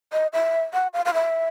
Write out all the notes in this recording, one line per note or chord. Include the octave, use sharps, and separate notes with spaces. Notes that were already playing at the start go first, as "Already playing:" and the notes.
D#5
E5
F#5
F5
F5
E5